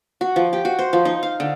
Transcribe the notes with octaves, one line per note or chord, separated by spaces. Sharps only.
F#4
F3
G4
F#4
C5
F3
D#4
F5
D3